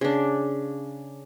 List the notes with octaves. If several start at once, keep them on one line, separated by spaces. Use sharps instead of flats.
C#3 D4